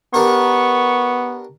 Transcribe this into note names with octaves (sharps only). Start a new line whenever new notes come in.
B3 D4 G4 A#4 C#6